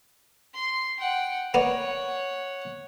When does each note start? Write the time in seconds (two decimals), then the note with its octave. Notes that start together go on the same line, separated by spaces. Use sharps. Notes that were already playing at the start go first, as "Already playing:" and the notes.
0.54 C6
0.99 F#5 G5
1.54 A#3 B3 C#5 D5 F#5